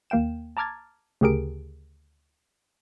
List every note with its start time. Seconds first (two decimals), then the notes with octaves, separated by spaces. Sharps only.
0.10 D#2 A#3 F5 G5 E7
0.57 A5 A#5 D6 F6 G#6 A6
1.21 D2 C#3 G4 G#4 A#4 D7